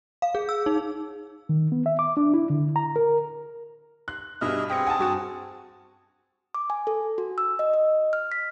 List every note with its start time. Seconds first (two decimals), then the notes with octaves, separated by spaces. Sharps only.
0.22 F5
0.35 G#4
0.49 E6
0.66 D#4
1.49 D#3
1.72 B3
1.86 E5
1.99 D6
2.17 D4
2.34 E4
2.50 D3
2.76 A#5
2.96 A#4
4.08 C6 F#6
4.41 G2 B2 G#4 D#5 E5 F6
4.70 C4 G#4 G5 A#6 C#7
4.87 F#5 G#5 A5
4.99 G2 F#4 F#5
6.54 D6
6.70 G#5
6.87 A4
7.18 F#4
7.38 E6
7.59 D#5
7.74 D#5
8.13 F6
8.32 B6